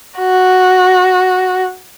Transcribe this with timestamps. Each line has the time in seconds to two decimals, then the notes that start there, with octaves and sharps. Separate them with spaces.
0.19 F#4